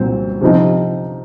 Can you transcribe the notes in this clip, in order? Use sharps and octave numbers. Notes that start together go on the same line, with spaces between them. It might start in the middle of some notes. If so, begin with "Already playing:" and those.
Already playing: C2 A#2 F#3 C4 C5
C3 F3 C4 D#4